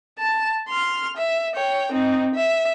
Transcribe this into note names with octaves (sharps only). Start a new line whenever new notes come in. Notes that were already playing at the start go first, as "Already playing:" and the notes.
A5
C6 F6
E5
C#5 G5
C4 D#4
E5